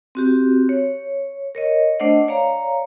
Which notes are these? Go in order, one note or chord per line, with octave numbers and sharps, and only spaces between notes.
C4 F#4 G4
C#5
A#4 C#5 D#5
A3 D4 C5 D5 D#5 F#5
C#5 D5 F5 A#5